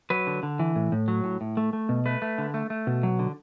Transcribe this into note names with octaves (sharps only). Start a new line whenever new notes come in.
F#3 B4
D3
D3
E3
A2
A2
F#3
A2
A2
A3
A3
B2
A3 B4
A3
D3
A3
A3
B2
F#3
D3